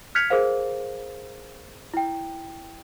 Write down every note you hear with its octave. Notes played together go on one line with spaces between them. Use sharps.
F6 F#6 G#6 B6 C#7 F7
G#4 A#4 C5 F5
E4 G5